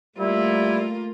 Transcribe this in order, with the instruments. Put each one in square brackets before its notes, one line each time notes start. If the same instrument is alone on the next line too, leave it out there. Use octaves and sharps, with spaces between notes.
[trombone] G3 [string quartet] A3 A#3 F4 [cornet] E4